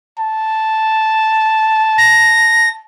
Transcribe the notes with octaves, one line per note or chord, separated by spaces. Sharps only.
A5
A#6